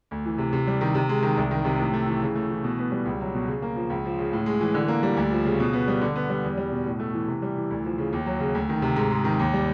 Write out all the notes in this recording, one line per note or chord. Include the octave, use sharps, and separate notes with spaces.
D2
E3
C3
C3
G3
D#3
C3
G#3
D#3
C2
D#3
C3
A2
A3
E3
C#3
A3
E3
B2
B3
G3
C#2
F#3
B2
C#3
A#3
F3
C#2
F3
C#3
A2
G#3
E3
D3
A#3
G3
D2
F3
C#3
B2
B3
G3
D3
B3
G3
E2
G3
B2
A2
A3
E3
C3
G3
E3
D2
F3
C#3
D#2
F#3
C#3
D2
D#3
C3
G#2
G#3
D#3
D#2
G3